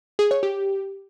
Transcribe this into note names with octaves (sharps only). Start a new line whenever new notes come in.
G#4
C#5
G4